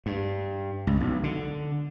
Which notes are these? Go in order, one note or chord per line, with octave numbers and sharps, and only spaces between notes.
G2
C#2
B1
D3